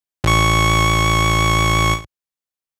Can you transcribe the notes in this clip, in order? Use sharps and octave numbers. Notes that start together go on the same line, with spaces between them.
A1 C#6